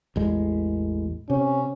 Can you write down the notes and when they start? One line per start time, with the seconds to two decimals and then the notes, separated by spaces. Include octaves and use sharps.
0.16 A1 E2 G#3
1.30 C3 C#4